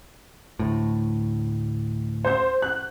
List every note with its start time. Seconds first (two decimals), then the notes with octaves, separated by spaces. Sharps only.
0.59 D2 A2
2.25 C5 G6
2.62 F#6